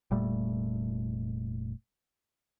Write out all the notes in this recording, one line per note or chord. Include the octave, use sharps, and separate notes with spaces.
F1 A#2 G3 A3